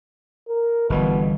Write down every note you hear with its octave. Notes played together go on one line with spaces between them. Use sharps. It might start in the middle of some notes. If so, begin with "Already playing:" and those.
A#4
G1 B2 E3